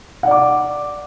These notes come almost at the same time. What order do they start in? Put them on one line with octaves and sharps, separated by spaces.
F#5 D5 D6